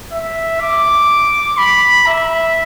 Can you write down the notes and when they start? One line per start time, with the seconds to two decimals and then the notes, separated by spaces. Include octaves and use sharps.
0.12 E5
0.60 D6
1.57 B5
2.06 E5